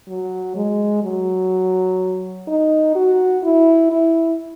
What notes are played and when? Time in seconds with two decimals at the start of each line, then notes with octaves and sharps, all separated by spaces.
0.08 F#3
0.55 G#3
1.03 F#3
2.48 D#4
2.95 F#4
3.44 E4
3.92 E4